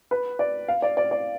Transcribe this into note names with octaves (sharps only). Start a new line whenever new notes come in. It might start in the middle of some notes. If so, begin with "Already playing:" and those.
B4
D5
F5
D5
D5
D5